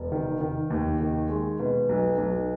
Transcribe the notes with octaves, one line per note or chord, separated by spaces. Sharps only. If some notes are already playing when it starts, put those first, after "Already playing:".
Already playing: E1
D#3
D#3
D#2
D#3
G#3
B2
B1
B1